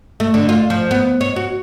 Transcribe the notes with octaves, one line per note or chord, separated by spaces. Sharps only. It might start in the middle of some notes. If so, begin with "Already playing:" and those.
A3
D3
F4
F3
B3
C#5
F#4